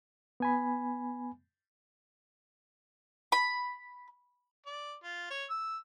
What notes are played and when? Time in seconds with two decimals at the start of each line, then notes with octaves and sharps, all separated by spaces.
0.40 B3 G#5 B5
3.32 B5
4.66 D5
5.04 F4
5.31 C#5
5.50 E6